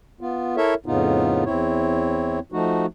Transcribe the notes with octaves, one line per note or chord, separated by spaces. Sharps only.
B3 F4
E4 A4 A#4 C#5 E5
F2 A2 C#3 B3 D#4 F4
E2 C4 E4 C#5
F3 A3 D#4 F#4